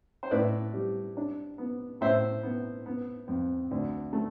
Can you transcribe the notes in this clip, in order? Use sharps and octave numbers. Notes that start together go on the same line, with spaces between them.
C5
A2 B4 D5
G3
D4
B3
A2 C5 E5
B3
B3
F2
D2
A3